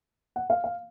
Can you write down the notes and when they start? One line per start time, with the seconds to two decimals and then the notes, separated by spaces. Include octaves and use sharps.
0.36 F#5
0.50 F5
0.64 F5